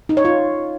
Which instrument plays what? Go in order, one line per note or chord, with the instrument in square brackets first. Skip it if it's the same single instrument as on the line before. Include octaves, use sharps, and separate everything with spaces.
[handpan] D#4
C#5
F4